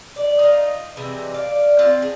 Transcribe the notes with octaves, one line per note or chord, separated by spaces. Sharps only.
D5
D#4 F4
C3 E3 G3 G#3
D5 F5
C4 F4
G#4